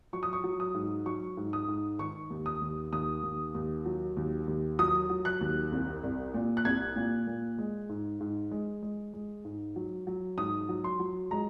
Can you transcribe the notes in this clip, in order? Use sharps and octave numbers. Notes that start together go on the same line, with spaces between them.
F#3 C#6
D#6
C#6
F#3
D#6
G#2
F#3 C#6
G#2
D#6
G#2
D#3 C#6
D#2
D#6
D#2
D#2 D#6
D#2
D#2
F#3
D#2
D#2
F#3 D#6
F#3
F#6
D#2
C2
C2
A#2
F#6
C2 G#6
A#2
A#2
G#3
G#2
G#2
G#3
G#3
G#3
G#2
F#3
F#3
G#2 D#6
F#3
C6
F#3
G#3 A#5